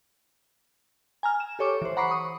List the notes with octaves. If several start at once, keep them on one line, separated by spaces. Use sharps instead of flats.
G#5 A#5 F6
E7
G4 A4 C#5 C#6 D6
E3 C5
F#5 A#5 B5 C#6 D6 C7
C#6 D#6